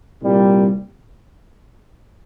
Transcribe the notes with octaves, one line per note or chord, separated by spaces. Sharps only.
C2 A#2 G3